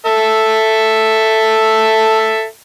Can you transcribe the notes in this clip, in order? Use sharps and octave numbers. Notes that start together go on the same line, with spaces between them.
A4 E5